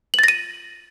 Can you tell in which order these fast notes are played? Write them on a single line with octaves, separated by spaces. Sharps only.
F#7 A6 A#6 D#7